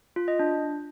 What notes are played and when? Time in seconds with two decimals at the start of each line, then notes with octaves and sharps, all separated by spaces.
0.16 F4
0.28 D#5
0.39 D4